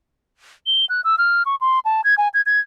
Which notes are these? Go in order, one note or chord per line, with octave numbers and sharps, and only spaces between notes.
G7
F#6
E6
F6
C#6
C6
A5
G#6
G#5
G#6
G#6